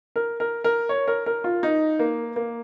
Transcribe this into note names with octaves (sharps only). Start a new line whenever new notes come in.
A#4
A#4
A#4
C#5
A#4
A#4
F4
D#4
A#3
A#3